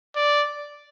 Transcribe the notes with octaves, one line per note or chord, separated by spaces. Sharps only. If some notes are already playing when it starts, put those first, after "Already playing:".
D5